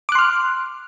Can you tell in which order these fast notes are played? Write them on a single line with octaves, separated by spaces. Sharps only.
D6 F#6 C6 F6